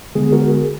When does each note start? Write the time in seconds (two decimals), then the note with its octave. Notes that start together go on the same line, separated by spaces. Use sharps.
0.15 D3 G#3 B3 G#4
0.32 F#4 A#4
0.50 G#4